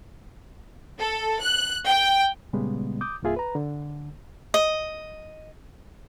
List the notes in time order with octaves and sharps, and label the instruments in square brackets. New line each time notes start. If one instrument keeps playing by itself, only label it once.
[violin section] A4
F#6
G5
[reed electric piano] A#2 C#3 G3 G#3 B3
D6 D#6 G6
C2 G2 A#3 F4 G#4 E5
B4 A#5
D3
[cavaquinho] D#5